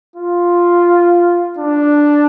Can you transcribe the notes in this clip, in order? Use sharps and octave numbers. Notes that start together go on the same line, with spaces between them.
F4
D4